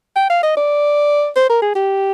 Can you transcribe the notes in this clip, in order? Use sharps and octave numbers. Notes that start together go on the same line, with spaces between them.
G5
F5
D#5
D5
C5
A#4
G#4
G4